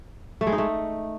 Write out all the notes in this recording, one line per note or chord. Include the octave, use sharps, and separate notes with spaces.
A3
G#3
D#4
A3